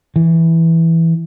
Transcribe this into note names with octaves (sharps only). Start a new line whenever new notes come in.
E3